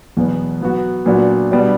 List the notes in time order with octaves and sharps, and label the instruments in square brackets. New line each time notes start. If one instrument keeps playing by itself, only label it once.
[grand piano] E2 B2 F#3 B3
F#3 B3 F#4
A#2 F#3 B3 D4 F#4
B2 G3 B3 D4 G4